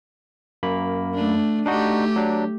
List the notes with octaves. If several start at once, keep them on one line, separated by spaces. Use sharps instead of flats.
F#2 A#3 B5
A3 D4
A3 D4 D#4 F#4 G4
F#3 D4